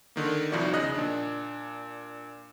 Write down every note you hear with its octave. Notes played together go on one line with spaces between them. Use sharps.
D3 D#3 A#3
C2 F3 D#4 E4 F#4 D5
E2 C#3 D#5 F#6
A#2 D4